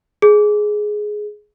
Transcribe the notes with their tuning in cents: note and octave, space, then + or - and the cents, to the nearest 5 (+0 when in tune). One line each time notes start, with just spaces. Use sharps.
G#4 +10